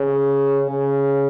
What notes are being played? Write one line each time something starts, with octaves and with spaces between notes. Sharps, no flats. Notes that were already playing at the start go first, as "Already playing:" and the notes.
Already playing: C#3
C#3